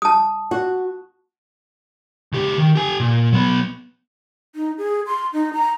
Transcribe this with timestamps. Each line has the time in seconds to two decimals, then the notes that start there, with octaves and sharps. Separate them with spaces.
0.02 A5 D#6
0.51 F#4
2.33 C#2 G4
2.58 D#3
2.75 G4 G#5
3.00 A#2
3.33 F#3 B3
4.56 D#4
4.78 G#4
5.07 C6
5.33 D#4
5.53 A#5